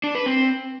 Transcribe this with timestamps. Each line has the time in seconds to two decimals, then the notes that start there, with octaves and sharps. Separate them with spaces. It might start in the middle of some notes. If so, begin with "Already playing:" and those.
0.04 D4
0.15 B4
0.26 C4